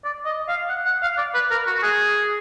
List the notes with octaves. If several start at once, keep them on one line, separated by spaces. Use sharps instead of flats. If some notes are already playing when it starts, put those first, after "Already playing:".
D5
D#5
F5
F#5
F#5
F5
D5
B4
A#4
F#4
F#4
G#4